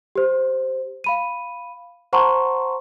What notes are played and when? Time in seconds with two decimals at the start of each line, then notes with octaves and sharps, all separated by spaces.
0.16 G4 C5
1.04 F5 B5 D#7
2.13 C5 F#5 A5 A#5 C6 C#6